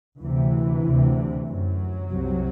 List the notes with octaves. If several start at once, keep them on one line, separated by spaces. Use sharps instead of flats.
D2 C3 E3
D2 C3
F#2 F#3
C2 C3